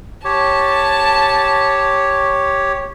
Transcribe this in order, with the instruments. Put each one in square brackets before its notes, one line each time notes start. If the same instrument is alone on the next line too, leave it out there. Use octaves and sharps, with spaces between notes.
[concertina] G4 C#5 [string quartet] A5